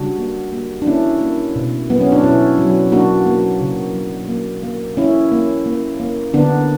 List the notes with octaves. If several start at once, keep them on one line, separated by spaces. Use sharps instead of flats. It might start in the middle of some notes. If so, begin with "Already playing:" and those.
Already playing: C#3 G3 D4 F#4
A#3
A#3
D4
A#3 C#4 E4
A#3
B2
F#3 B3
C#4
D4
B2 C#4 E4
F#3
A#3 D4 F#4
A#3
C#3
F#3
A#3
A#3
A#3 C#4 E4
A#3
A#3
A#3
D3 B3 D4